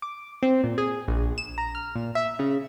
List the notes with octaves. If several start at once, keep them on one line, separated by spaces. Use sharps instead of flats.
D6
C4
A#2
G#4
A#1
E7
A#5
F6
A#2
E5
C#3